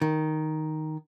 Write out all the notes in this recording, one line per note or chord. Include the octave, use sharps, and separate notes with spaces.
D#3